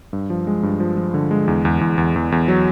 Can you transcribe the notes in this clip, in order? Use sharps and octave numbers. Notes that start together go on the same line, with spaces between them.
G2
F3
G#3
G2
F3
F3
D3
G#3
E2
E2
E2
E2
E2
E2
F#3